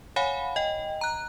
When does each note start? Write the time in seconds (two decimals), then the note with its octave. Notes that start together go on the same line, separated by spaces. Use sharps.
0.16 C#5 F5 F#5 G#5 B5
0.56 D#5 G5
1.01 A#5 F#6